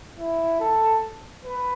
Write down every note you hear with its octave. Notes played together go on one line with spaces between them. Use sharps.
E4
A4
B4